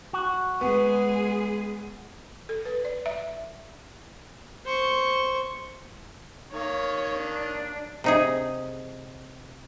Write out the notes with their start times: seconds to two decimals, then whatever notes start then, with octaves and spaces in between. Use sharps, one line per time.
0.13 F#4
0.61 G#3 B3 G#4
2.49 A4
2.65 B4
2.85 D5
3.06 E5
4.65 C5 C#6
6.53 D#3 A#3 C#5
7.19 D4
8.04 C3 D#4 G#4